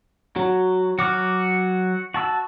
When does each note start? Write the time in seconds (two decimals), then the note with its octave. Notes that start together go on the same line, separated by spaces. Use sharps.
0.36 F#3 F#4
0.99 F#3 F#4 D6 F6
2.14 F#4 A5 E6